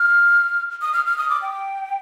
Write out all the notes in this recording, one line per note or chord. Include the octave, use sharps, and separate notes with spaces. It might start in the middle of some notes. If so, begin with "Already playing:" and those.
Already playing: F6
D#6
F6
F6
D#6
D6
G5